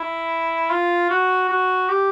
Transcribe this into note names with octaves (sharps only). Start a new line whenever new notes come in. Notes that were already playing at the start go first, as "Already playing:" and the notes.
Already playing: E4
F4
F#4
F#4
G4